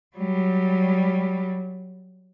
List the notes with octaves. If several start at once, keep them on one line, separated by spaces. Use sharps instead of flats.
F#3 G3